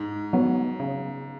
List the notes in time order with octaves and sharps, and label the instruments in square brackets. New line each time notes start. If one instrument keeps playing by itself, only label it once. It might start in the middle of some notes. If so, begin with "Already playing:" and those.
Already playing: [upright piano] G#2
[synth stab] F#3 B3
C#3